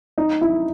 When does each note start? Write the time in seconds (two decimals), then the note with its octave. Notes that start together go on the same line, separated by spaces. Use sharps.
0.18 D#4
0.41 E4